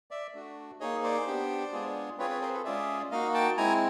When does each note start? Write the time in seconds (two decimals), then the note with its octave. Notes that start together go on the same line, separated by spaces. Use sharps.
0.11 D5 E5
0.34 A3 D4 F#4
0.80 A#3 D#4 G#4 C#5 D#5
1.03 C5 D5
1.27 B3 D4 G4
1.72 G#3 B3 D4 F4 G#4
2.18 C4 F4 G#4 B4 C#5
2.30 B4 C#5
2.41 A#4 C5
2.54 A4 B4
2.65 G#3 C#4 F4 G#4 D5 E5
3.11 A#3 D#4 F#4 D#5 F5
3.34 G5 A5
3.57 G#3 C4 E4 G#5 A#5